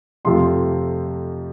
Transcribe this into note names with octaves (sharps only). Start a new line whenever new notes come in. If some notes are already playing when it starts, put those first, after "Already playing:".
F2 C3 F3 A3 C6